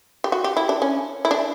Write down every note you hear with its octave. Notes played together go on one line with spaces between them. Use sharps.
G4
F#4
G4
E4
D4
C#4
E4
D4